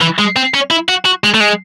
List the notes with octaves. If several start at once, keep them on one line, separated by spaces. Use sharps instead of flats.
E3
G#3
C4
C#4
E4
F#4
F#4
G#3
A3
G#3